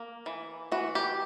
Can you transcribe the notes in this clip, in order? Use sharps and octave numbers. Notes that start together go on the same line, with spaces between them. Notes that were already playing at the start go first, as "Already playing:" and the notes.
Already playing: A#3
E3
E3 F#4
G4